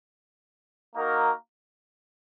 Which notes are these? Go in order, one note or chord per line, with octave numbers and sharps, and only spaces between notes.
A#3 D#4 F#4 A#4